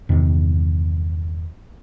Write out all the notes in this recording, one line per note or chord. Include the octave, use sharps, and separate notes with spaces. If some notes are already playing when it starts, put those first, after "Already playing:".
E2 G2 C3 D#3